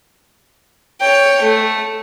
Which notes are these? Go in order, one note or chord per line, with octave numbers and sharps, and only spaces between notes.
C#5 G5
A3